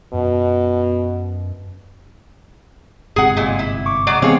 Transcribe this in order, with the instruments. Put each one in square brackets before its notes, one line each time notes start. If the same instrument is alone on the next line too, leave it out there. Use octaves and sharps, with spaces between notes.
[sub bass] F#2 [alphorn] B2
[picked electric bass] G1 G#2 C3 [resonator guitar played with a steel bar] G#4 F#5
[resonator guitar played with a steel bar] A#2 G#3
E4
[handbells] C#6 D6
[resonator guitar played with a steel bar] F#3 G#3 D5
[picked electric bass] C3 E3 G#3 [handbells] B3 C4 F5 [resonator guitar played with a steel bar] G#4 C#5